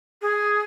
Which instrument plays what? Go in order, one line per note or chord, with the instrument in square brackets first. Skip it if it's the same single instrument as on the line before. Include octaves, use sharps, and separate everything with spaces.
[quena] G#4